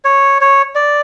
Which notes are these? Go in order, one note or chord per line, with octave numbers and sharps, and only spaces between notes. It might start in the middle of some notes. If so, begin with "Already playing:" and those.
C#5
C#5
D5